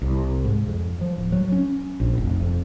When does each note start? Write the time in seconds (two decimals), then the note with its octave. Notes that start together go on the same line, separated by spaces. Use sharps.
0.02 C2
0.44 G#2
0.67 F2
1.01 F3
1.16 D1
1.32 F#3
1.52 C#4
2.00 A#1
2.18 F1
2.40 F2